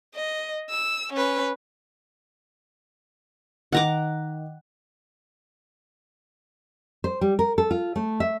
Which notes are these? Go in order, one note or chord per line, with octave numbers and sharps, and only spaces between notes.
D#5
E6
C#4 B4
D#3 F#5 A#5 D6
C5
G3
A#4
A4
F4
A3
E5